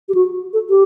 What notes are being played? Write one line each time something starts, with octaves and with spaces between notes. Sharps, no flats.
G4
F#4
A4
G4